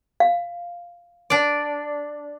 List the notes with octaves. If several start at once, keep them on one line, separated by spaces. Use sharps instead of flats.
F5
D4 D5